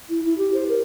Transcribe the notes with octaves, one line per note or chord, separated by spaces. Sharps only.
E4
E4
G4
C5
A#4